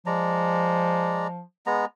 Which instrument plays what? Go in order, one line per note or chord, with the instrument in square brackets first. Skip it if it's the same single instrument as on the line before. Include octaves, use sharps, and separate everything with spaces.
[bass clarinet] F3 [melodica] G#3 D5 A#5
[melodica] G#3 B3 A#5